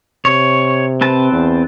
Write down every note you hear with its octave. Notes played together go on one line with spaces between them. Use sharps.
C3 C#5
C4 B4 A5
E2